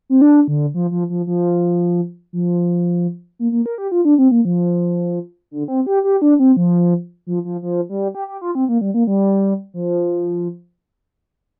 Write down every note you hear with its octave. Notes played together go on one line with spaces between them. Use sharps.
C4
D4
D3
F3
F3
F3
F3
F3
A#3
A#3
A#4
G4
F4
D4
C4
A#3
F3
D3
C4
G4
G4
D4
C4
F3
F3
F3
F3
G3
G4
G4
F4
C4
A#3
G3
A#3
G3
F3